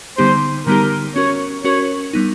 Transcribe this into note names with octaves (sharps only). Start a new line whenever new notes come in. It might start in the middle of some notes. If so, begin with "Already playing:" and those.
D3 G3 B3 D#4 G4 C5
D3 G3 B3 D#4 G4 A#4
C#4 F#4 A#4 C#5
C#4 F#4 A#4 C#5
G3 B3 D#4